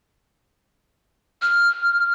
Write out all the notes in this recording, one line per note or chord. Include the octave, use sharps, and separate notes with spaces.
F6